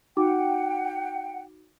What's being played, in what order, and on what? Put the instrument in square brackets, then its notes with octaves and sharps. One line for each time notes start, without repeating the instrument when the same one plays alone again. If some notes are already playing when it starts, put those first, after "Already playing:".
[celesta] D#4 F#4 D6 [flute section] F#5 G5